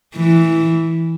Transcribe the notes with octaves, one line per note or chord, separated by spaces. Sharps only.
E3